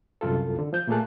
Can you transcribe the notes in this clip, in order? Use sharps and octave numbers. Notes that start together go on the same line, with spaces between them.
C2 F#2 F4 A4
D3
F3 G6
A#2 A3 A#3 G#4 A5 F#6